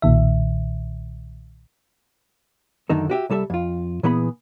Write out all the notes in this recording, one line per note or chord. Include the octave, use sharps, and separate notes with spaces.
B1 A#2 D#3 E5
F#2 D3 D#3 D#4 A4
F#4 G4 E5
C2 G3 A4 D5 E5
F2 F4
A#2 E3 B3 G#4 B5